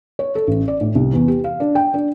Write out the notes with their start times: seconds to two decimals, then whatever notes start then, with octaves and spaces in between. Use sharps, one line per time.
0.19 C#5
0.35 A4
0.47 A1
0.68 D5
0.81 A2
0.95 C2
1.13 E2
1.28 G4
1.44 F5
1.60 D4
1.75 G5
1.94 D4